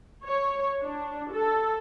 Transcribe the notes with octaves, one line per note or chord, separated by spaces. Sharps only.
C#5
D4
A4